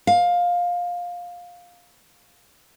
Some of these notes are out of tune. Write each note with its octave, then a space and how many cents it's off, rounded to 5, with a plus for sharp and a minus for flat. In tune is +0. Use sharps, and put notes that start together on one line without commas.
F5 +15